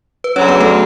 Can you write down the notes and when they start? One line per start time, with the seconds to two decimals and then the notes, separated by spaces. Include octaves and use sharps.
0.24 B4
0.36 D2 C#3 F#3 C#4 C#5
0.48 B3 B4
0.61 A3 A4